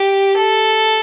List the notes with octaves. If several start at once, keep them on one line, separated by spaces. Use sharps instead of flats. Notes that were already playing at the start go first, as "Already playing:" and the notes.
Already playing: G4
A4